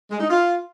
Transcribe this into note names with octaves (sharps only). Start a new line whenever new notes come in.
G#3
D#4
F4